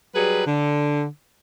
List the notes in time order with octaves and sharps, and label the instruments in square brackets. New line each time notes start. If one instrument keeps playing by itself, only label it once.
[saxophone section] F#3 G3 G#4 B4
D3